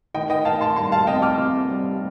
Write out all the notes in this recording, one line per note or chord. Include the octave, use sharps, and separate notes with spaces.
D#3 D#5 G5
D#5 G5
D#3 F5 A5
A5 C6
G3 A5 C6
F5 A5
C3 D#5 G5
D6 F6
C3
G3